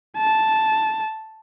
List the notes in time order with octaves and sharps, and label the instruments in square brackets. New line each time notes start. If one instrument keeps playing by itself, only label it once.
[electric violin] A5